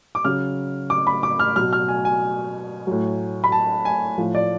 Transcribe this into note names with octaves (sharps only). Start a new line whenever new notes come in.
D6
C#3 F#3 F6
D6
B5
D6
F6
B2 F#3 F6
F6
G#5
G#5
A2 F#3
B5
A5
G#5
A2 F3
D5